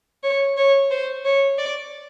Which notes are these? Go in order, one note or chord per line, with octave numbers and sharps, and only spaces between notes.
C#5
C#5
C5
C#5
D5